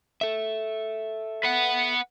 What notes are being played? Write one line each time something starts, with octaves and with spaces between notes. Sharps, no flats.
A4 E5
B4 F#5